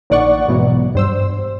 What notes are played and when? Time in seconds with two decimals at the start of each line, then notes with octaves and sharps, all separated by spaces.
0.10 A#1 D#3 D5 F#5 C#6
0.48 G#2 B2 E3 F#3
0.95 G2 C5 E6